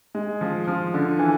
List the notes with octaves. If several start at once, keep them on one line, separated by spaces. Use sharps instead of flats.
G#3
F3
F3
D3
E3